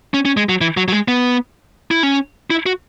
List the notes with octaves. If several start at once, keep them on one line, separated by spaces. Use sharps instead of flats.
C#4
C#4
G#3
F#3
E3
F#3
F#3
G#3
B3
E4
C#4
E4
F#4